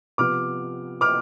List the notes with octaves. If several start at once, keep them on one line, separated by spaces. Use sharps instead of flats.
C3 F3 B3 D6 F6
D6 F6